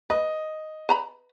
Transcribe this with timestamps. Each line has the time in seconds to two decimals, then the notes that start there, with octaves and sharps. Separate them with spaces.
0.10 B4 D#5
0.89 B4 A#5 B5